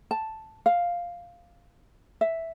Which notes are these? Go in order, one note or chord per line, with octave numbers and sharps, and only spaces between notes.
A5
F5
E5